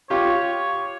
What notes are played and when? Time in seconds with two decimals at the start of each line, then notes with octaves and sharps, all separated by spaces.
0.10 F4 G4 C#5